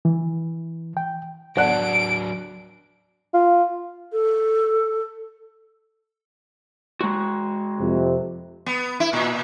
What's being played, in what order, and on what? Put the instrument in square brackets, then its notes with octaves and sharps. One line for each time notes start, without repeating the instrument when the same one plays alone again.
[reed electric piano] E3
G5
[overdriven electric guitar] F#3 D4 [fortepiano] D5 F#5 [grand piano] A5 F#6 [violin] D7
[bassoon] F4
[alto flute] A4
[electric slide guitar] G#3 F#4
[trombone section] F2 C3
[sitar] B3
E4
A#2